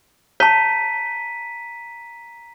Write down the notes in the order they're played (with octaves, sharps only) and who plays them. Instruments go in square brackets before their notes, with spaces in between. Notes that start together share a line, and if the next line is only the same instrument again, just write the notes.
[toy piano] C#5 A5 [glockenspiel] A#5 B6 D#7